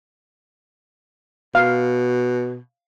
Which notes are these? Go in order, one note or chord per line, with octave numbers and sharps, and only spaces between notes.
B2 F5